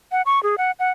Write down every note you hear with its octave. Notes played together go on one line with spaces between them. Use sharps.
F#5
C#6
G#4
F#5
F#5